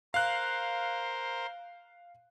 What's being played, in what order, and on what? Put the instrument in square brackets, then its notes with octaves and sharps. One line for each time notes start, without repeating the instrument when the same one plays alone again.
[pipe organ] A#4 C5 [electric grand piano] F5 F#6